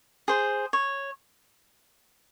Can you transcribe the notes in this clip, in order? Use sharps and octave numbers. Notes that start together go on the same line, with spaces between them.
G#4 C5
C#5